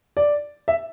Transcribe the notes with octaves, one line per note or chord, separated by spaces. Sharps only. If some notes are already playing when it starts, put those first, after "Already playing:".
D5
E5